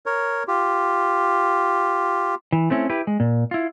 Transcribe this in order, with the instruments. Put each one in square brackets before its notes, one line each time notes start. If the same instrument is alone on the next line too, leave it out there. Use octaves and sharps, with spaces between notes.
[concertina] A#4 C#5
F4 G4
[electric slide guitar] E3
A3 C4 C#4 E4
E4 G4 B4
G#3
A#2
E4 F4